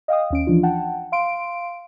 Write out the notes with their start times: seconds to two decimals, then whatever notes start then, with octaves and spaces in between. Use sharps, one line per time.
0.08 D#5 F5 G5 D#6
0.30 D#2 C#4 D7
0.47 E3 F3 D4 F4
0.63 F#5 G5 A5
1.12 F5 C6 D7